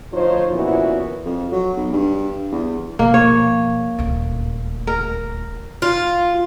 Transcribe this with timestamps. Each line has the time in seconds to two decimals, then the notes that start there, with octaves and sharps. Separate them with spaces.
0.12 D2 F3 D#4 F4 C5 C#5
0.53 A#2 E3 B3 C#4 E4 F#4
1.25 F2
1.52 F#3
1.76 B1
1.93 G2
2.51 E2
2.99 B2 F3 A#3
3.14 C#5
3.99 D#1 D2
4.87 A#4
5.82 F4